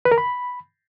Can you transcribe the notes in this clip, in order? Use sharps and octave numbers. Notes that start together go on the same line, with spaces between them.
B4
A#4
B5